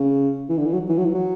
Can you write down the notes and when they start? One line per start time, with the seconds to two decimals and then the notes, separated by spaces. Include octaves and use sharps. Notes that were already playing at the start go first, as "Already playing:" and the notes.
Already playing: C#3
0.49 E3
0.58 D3
0.66 E3
0.73 F#3
0.89 E3
0.98 F#3
1.05 E3
1.14 F#3